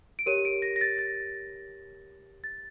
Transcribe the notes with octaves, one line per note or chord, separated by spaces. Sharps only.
D7
G4 A#4 C#5 D#7
D7
A#6
A#6
A6
A6
A6